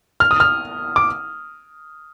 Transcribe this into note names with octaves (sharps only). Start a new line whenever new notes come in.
F6
D#6
F6
D6